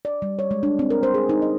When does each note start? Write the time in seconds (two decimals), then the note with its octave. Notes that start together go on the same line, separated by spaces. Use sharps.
0.05 D5
0.22 G3
0.39 C#5
0.51 G#3
0.63 D4
0.79 C4
0.90 A#4
1.03 C5
1.14 G#4
1.29 D#4
1.42 D#5